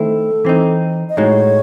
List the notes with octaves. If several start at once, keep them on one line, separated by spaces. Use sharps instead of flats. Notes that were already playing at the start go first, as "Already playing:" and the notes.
Already playing: D#3 A3 C4 E4 A4
E3 C4 D#4
D#5
A2 G#3 D#4 F#4 C#5